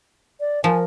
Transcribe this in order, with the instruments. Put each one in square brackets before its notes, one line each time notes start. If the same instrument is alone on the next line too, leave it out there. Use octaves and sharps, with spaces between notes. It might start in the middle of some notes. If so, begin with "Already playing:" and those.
[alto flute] D5
[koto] F3 [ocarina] A#4 [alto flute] G#5